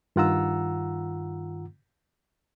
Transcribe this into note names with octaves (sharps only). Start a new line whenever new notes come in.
G2 D#3 F4 F#5 A#5 E6